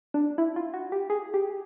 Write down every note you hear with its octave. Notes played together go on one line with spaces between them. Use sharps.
D4
E4
F4
F#4
G4
G#4
G4